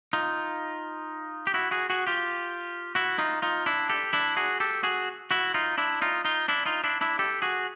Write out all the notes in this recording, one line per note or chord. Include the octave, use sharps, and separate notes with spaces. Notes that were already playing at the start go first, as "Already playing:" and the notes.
D#4 F4
G4
E4 F#4
F#4 G#4
F#4 G#4
F4 G4
E4 F#4
D#4 F4
D#4 F4
D4 E4
G4 A4
D4 E4
F#4 G#4
G4 A4
F#4 G#4
E4 F#4
D#4 F4
D4 E4
D#4 F4
D#4 F4
D4 E4
D#4 F4
D4 E4
D4 E4
G4 A4
F#4 G#4